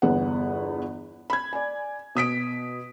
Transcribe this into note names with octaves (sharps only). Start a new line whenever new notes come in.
G1 E2 B3 F#5
B5 G#6
D5 G#5
B2 D#6 B6 D7